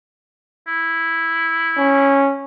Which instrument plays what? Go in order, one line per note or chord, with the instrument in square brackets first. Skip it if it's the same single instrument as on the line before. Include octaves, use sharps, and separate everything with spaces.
[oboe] E4
[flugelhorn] C#4